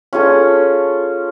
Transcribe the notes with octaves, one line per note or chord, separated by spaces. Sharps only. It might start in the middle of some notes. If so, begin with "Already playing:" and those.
C#4 F4 G#4 A4